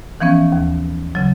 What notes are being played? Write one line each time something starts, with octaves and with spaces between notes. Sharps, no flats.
E3 F3 B3 C#4
D#2
C#3 F#3